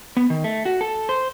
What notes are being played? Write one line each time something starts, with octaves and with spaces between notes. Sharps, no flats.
B3
D#3
A3
F#4
A4
C5